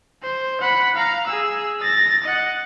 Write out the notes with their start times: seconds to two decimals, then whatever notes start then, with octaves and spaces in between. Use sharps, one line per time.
0.22 C5
0.61 F#5 B5
0.95 F5 A#5
1.27 G#4 E6
1.81 A6 A#6
2.24 D#5 F#5